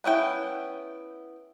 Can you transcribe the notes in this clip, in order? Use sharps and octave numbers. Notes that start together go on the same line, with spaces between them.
B3 C#4 E4 G5